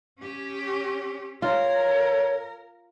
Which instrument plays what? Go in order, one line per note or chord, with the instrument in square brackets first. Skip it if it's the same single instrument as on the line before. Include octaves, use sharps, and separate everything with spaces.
[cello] C#4 G4
[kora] F4 [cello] A#4 [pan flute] C#5